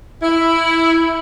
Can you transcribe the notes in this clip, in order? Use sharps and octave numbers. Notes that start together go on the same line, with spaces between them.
E4